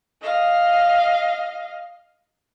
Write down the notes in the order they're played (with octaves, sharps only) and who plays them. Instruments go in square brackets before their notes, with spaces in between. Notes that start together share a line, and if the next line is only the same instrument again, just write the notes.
[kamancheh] D#5 F5